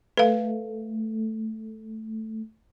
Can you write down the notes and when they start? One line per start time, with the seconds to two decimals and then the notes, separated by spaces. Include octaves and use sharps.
0.17 A3 B4 F5